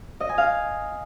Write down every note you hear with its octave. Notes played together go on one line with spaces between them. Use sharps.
D#5
G#5
F5